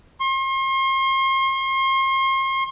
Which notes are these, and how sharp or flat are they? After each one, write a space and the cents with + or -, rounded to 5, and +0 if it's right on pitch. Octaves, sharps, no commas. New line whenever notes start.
C6 +40